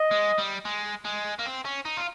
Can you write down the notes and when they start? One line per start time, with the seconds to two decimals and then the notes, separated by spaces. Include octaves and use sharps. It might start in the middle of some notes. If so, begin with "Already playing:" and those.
Already playing: D#5
0.11 G#3
0.38 G3
0.65 G#3
1.05 G#3
1.39 A#3
1.46 C4
1.65 C#4
1.85 D#4
1.97 F4